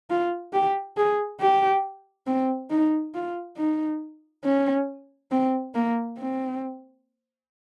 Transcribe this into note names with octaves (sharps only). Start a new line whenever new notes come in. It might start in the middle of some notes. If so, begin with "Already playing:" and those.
F4
G4
G#4
G4
C4
D#4
F4
D#4
C#4
C4
A#3
C4